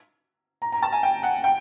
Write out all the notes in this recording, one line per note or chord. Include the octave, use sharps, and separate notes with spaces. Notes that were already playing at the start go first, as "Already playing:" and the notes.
A#5
A#5
A5
G#5
G5
F#5
G5